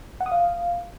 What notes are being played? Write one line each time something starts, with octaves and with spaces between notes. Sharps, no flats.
F#5
D#6
F5